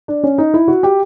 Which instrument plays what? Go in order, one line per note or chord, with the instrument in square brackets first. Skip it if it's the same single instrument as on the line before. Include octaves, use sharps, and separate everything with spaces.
[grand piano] D4
C#4
D#4
E4
F#4
G4